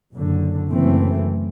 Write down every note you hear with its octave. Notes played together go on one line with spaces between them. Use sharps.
F#1 F#2 D3
F#1 F#2 E3 A3 C4